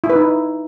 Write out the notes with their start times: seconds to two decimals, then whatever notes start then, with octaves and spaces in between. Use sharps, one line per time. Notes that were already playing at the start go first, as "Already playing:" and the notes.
0.04 E4
0.10 B4
0.16 D#4
0.21 E4